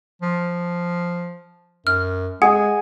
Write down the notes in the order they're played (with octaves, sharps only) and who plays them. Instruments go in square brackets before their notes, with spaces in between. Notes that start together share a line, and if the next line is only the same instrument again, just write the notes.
[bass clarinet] F3
[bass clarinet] F#2 [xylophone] F6
[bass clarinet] G#3 [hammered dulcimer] G#4 [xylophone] F#5